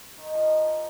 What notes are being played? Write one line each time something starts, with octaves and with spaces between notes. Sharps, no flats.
D#3
D#4
F3